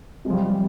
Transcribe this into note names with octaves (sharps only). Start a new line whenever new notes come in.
C3 G#3
F3 G3
G3